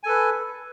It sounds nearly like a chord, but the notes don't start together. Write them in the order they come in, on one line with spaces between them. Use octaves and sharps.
G#5 A4 B4